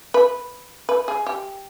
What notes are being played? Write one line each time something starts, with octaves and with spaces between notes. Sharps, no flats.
B4
B4
G#4
G4